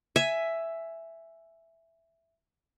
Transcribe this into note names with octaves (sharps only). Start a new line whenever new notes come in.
E5 G#5